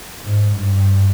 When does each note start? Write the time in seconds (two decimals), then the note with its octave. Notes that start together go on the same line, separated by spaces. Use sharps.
0.21 G#2
0.54 G2